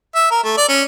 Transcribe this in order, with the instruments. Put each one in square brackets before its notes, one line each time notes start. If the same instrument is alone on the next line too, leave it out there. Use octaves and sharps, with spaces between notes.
[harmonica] E5
A#4
A3
D5
C#4